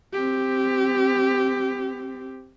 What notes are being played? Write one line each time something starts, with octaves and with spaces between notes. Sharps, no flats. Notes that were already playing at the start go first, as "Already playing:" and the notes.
C4 G4